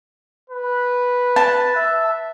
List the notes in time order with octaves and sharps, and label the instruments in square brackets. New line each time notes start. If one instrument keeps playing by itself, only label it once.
[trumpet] B4
[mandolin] A5
[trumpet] E5